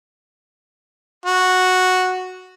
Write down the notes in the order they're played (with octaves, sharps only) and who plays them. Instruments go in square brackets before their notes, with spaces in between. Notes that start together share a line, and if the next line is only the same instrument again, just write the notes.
[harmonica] F#4